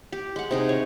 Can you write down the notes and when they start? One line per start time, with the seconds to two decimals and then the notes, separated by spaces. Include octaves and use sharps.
0.12 G4
0.36 G#3 F#5
0.51 C3 D#4 G#4
0.69 C#5